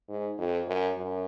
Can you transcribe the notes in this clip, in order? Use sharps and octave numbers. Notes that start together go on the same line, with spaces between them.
G#2
F2
F#2
F#2